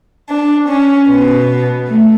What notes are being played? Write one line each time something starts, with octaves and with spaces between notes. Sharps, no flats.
D4
C#4
B2 B3
A3